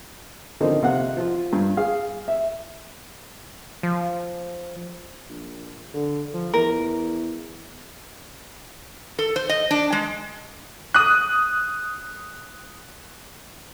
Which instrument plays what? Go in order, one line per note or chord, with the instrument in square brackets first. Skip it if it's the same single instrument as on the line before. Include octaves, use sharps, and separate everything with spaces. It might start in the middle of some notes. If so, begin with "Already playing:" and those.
[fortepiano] D3 D#3 F3 C4 D#4
C3 F5 F#5
F3 F4
G2
G#4 F5
E5
[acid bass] F3
[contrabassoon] A#1
D3
F3
[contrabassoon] E2 [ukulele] A#4
[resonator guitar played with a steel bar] A4
C5
D#5
D4
G#3
[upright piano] D#6 F#6